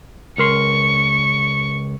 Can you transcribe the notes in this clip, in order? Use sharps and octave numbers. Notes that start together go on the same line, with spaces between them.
C#2 A#4 C6 C#6